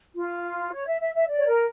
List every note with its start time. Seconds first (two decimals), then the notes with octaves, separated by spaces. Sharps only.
0.15 F4
0.72 C#5
0.85 E5
1.00 E5
1.13 E5
1.27 D5
1.37 C#5
1.45 A#4